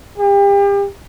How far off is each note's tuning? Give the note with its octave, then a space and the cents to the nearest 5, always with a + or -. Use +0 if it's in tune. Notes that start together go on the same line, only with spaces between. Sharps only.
G4 +35